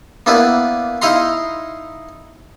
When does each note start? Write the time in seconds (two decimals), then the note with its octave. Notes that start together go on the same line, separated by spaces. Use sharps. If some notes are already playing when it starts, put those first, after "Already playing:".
0.26 A#3 B3 D4 E4 B4
1.02 D#4 E4 D#5 F5 A#5 C6